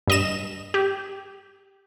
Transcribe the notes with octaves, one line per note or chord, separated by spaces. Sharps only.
G2 D#5 E7
G4